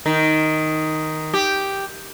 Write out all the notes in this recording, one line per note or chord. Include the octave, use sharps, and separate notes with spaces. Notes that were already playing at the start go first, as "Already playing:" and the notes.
D#3
G4